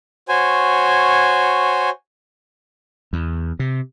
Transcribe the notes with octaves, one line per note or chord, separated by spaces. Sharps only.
F#4 C5 C#5 G#5
E2
C3